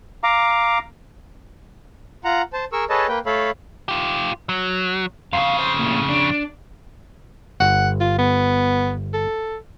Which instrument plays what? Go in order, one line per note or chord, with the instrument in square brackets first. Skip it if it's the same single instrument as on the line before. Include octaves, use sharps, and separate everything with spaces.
[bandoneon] F5 A#5 D6
[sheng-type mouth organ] F4 F#5 A#5
C5 A5
G#4 A#4 C#6 E6
G#4 A4 B4 C#5 D#5 A5
A#3 B4 G5
A3 A4 C#5 F5 B5
[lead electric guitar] F4 G4
F#3
[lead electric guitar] F2 C#3 [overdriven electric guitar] F5
[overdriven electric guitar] C5
A2 A#3
D4
[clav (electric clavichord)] G1 [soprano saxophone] F#5
[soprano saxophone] F4
B3
A4